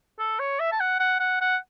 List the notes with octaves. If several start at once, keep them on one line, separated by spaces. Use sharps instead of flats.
A4
C#5
E5
A5
F#5
F#5
F#5
F#5